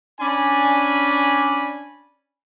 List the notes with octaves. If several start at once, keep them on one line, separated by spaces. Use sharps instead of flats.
C#4 D4 D5 G#5 B5